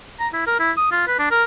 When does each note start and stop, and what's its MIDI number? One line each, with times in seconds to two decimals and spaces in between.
0.20 0.28 82
0.33 0.43 64
0.47 0.55 70
0.60 0.72 64
0.77 0.90 87
0.92 1.04 65
1.07 1.15 71
1.19 1.30 62
1.31 1.44 70